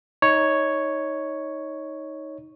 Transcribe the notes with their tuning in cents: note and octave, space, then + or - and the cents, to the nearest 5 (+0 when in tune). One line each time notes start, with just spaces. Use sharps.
D#4 +15 C#5 +0